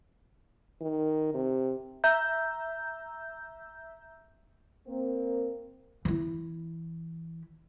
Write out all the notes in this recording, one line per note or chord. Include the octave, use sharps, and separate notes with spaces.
D#3
C3
E5 A#5 E6 G6
A#3 C4
E3 E4